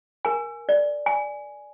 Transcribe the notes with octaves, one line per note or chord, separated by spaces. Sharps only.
A#4 G#5
D5
G#5